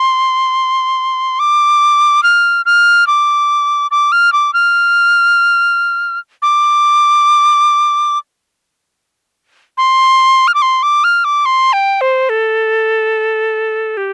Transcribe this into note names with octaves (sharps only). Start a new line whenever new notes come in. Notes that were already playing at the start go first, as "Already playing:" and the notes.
Already playing: C6
D6
F6
F6
D6
D6
F6
D6
F6
D6
C6
F6
D6
C6
D6
F6
D6
C6
G5
C5
A4
G4